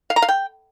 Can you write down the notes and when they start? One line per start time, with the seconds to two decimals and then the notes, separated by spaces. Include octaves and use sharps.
0.10 F5
0.16 A#5
0.22 F5
0.29 G5